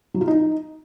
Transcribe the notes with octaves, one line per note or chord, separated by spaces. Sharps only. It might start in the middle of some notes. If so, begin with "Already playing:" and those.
F#3
F4
D#4